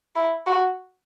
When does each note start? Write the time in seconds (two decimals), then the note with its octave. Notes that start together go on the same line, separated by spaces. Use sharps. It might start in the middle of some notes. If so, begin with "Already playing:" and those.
0.16 E4
0.47 F#4